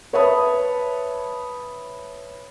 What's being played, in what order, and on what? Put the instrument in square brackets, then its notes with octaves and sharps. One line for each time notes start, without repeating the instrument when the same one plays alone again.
[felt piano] B4 C#5 E5 A5 B5 D#6